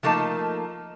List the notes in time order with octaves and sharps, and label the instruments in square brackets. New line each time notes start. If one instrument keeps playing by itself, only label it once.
[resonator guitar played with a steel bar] F3 A3 A#3 D#4 A5